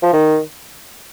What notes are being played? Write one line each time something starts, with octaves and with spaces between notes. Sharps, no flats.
F3
D#3